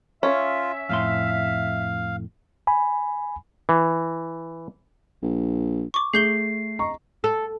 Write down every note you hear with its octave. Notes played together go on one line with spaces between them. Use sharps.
C#4 F4 E5
F2 A2 F5 C6
G#5 B5
E3
A#1
C#6 D6
A3 G#4 G6 C7 G7
D#5 A#5 C#6
A4